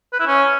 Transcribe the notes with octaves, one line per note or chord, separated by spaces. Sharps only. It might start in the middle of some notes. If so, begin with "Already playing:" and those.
B4
E4
C#4